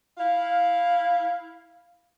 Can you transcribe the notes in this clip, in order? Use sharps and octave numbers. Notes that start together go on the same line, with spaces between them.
E4 F5